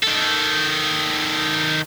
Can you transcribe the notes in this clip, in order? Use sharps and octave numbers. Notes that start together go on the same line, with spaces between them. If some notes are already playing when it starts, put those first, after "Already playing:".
D#3 A4